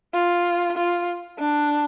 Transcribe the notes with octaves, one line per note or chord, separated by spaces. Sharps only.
F4
F4
D4